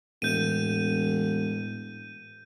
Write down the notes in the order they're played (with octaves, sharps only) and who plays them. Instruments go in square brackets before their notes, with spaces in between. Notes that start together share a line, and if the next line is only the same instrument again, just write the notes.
[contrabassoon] E1 [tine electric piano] A2 [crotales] G6 D#7